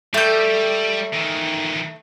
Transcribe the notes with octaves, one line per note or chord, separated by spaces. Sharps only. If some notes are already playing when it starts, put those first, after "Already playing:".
G3 A3 G4 G6
D#3 E3